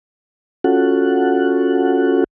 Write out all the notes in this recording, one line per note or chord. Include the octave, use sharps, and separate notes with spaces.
C#4 F4 F#4 A4 F#5